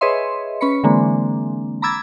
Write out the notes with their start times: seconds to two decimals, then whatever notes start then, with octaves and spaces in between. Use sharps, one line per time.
0.01 G#4 B4 C#5 D#5 E5 C6
0.61 C#4 B4 B5 C#7
0.83 D3 E3 G#3 A#3 C4 D4
1.82 A#5 B5 D6 E6 G#6 A6